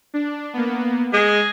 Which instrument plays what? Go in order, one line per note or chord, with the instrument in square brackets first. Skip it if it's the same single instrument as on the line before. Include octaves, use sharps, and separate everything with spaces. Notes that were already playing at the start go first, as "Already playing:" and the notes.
[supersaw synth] D4
A#3 B3
[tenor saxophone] G#3 [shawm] G#4 [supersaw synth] A#6